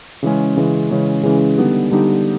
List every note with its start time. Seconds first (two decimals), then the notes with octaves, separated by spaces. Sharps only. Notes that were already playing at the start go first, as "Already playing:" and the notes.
0.23 C#3 E3 G#3 C#4
0.57 C#3 E3 G#3 C#4
0.91 C#3 E3 G#3 C#4
1.23 C#3 E3 G#3 C#4
1.58 D3 G3 B3 D#4 G4
1.91 D3 G3 B3 D#4 G4